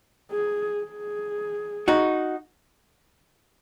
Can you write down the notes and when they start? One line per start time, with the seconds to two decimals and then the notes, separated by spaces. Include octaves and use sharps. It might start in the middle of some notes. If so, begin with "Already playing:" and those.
0.32 G#4
0.84 G#4
1.88 D#4 F#4